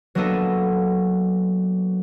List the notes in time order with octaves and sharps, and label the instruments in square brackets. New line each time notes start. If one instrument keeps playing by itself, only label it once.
[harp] F#3 A#3 B3 D4 A4 D#5